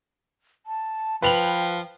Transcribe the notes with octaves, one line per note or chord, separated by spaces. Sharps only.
A5
F3 B4 G5 F7 F#7